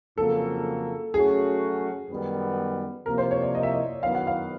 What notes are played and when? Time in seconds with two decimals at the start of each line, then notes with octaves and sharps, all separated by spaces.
0.17 F2 C#3 F#3 A#3 A4
1.14 F#3 A3 C#4 F#4 G#4
2.10 F#2 D#3 G3 B3
3.06 C3 F3 A#3 A#4
3.18 C5
3.31 C#5
3.42 D5
3.55 D#5
3.63 E5
3.72 D#5
4.03 F#2 D#3 F#3 B3 F5
4.15 F#5
4.27 F5